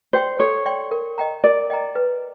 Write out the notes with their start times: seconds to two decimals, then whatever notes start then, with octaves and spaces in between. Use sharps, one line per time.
0.13 C5 D5 G5 C6
0.39 A4 C#5
0.66 D5 G5 C6
0.91 A#4
1.18 D#5 G5 A#5
1.44 A#4 D5
1.70 D#5 G5 A#5
1.95 B4